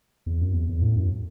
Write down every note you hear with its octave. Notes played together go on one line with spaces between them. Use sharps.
E2
F#2
E2
E2
A2
F#2